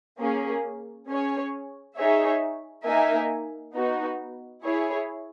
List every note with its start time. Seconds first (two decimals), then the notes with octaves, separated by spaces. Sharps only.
0.19 A#3 C#4 G#4
1.08 C#4 G#4 C#5 G#5
1.97 D#4 G#4 C#5 E5
2.85 A#3 D#4 A#4 E5 G#5
3.74 B3 D#4 F#4
4.63 E4 G#4 C#5